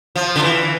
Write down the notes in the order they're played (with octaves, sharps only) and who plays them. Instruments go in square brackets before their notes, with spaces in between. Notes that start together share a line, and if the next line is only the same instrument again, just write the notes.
[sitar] F3
D3
E3